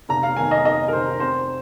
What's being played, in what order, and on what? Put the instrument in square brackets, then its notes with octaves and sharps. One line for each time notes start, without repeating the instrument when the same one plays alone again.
[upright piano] F1 A#5
F5
D#3 G#5
D#5
D#3 D#5
A#4
F1 C5
C4 C5